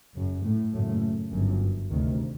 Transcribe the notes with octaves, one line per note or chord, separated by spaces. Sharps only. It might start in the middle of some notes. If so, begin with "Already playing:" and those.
F#1 F#2
A2 A3
F#1 F#2 A2 A3
G1 F#2
D2 C3 D#3